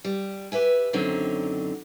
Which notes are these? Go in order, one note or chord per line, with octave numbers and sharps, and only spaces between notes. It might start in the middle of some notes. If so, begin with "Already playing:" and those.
G3
G4 B4 E5 G#5
F#2 D3 D#3 F#3 C4 D#4